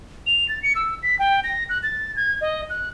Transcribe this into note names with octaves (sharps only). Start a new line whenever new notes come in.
F7
A6
C#7
E6
B6
G5
A#6
F#6
A6
G#6
D#5
F#6